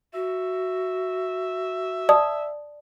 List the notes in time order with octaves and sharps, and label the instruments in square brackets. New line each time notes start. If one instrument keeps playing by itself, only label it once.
[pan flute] F#4 [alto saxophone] E5
[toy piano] D5 [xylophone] A5 D#6